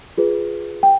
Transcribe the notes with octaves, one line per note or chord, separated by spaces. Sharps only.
F4 G#4 B4
G5